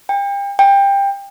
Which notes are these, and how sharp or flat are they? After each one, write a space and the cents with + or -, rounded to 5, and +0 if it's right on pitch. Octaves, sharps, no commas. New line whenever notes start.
G5 +35
G5 +20